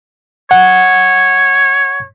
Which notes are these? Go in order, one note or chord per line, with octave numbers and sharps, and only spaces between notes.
C#5 F#5